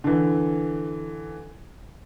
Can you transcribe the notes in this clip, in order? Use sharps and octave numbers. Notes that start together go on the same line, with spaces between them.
D3 E3